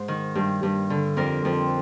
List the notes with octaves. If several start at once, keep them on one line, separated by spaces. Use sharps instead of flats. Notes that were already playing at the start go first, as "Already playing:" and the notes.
Already playing: G#2 C5
D#3
G2
G2
D3
F2 A#4 D5
F2